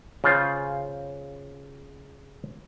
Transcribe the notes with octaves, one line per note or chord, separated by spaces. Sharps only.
C#3 F4 C5